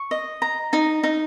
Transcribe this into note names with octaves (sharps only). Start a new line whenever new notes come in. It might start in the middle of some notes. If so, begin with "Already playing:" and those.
Already playing: C#6
D#5
A#5
D#4
D#4